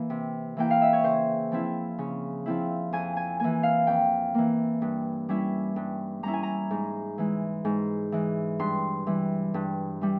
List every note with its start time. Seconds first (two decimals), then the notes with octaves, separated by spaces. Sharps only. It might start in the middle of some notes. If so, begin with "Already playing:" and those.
Already playing: E3 A#3 E4
0.10 C3
0.57 E3 A#3 E4 G5
0.71 F5
0.82 E5
0.93 C#5
1.04 C#3 C5
1.52 F3 C4 E4
1.99 C#3
2.46 F3 C4 E4
2.93 F2 G#5
3.17 G#5
3.40 E3 A#3 G#5
3.63 F5
3.87 F2 G5
4.34 E3 A#3
4.82 G2
5.29 G3 C#4 E4
5.76 G2
6.23 G3 C#4 E4 A#5
6.33 G#5
6.43 A#5
6.71 G#2
7.18 E3 G#3
7.65 G#2
8.12 E3 G#3
8.59 G2 C6
9.07 E3 G3
9.54 G2
10.01 E3 G3